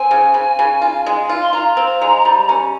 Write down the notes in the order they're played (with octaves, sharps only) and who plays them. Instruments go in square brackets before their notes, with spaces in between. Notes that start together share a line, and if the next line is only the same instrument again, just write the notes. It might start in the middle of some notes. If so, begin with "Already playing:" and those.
Already playing: [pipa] C4 [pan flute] G#5
[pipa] C#3
C#3
C#3
F4
G#3
F4
[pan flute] C6
[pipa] F4 [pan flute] A#5
[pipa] C4
G#3
G3
C#4